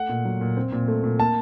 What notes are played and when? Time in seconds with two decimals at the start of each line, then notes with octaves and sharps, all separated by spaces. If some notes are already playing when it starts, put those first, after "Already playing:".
Already playing: A3 F#5
0.09 A#2
0.25 F#3
0.41 A#2
0.57 C4
0.72 A#2
0.88 A3
1.04 A#2
1.19 A#3 A5